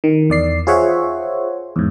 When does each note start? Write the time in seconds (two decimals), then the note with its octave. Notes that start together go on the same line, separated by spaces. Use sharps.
0.04 D#3
0.30 E2 D5 C7
0.67 F4 G#4 C5 C#5 E5 F#5
1.76 E2 G#2